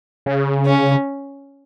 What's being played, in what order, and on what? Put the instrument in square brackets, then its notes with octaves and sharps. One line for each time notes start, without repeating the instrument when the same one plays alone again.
[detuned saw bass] C#3
[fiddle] C#4